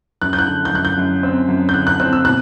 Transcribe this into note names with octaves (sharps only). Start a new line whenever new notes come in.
F#2 F#6
G6
F#6
D3
G6
F#2 F#6
G6
F#2
C4
F#2
G6
D3 F#6
F#6
C4 F#6
E6
B2 F#6